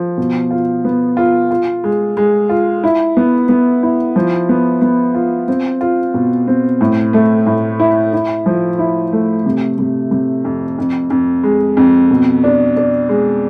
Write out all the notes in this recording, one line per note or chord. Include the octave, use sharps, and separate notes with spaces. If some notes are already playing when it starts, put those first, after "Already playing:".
Already playing: F3
B2
F4
B3
F4
F4
G#3
G#3
F4
E4
B3
B3
E4
F3
B3
B3
F4
C4
F4
B2
C4
A2
A3
A2
E4
E4
F3
E4
A3
C3
C3
C3
F2
F2
F2
G#3
F2
B2
D4
D4
G#3